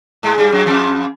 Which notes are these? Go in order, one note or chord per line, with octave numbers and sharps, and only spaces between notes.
G#2 G#3
G2 G3
F#2 F#3
F2 F3